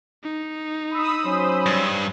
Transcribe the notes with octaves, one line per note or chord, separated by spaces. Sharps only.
D#4
B5 D#6 E6
F#3 C#4 C5
G2